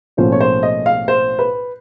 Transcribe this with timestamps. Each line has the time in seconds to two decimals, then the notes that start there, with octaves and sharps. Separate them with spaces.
0.17 B1 A2 F3 A#3 C#4 C5
0.32 C#5
0.40 C5
0.63 D#5
0.86 F5
1.08 C5
1.39 B4